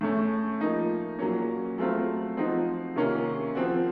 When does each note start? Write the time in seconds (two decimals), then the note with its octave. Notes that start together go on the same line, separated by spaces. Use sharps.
0.01 A2 A3 C#4
0.61 F3 A#3 D#4
1.19 A#2 F#3 A#3 C#4
1.78 F#3 A3 C4 F4
2.37 F3 C4 D#4 F#4
2.96 C3 D#3 A#3 C#4 F4
3.55 F3 C4 F#4